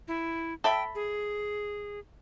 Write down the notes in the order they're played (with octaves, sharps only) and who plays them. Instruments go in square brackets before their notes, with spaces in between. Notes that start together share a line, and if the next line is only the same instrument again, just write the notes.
[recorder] E4
[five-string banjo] A4 E5 B5 [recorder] G5
[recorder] G#4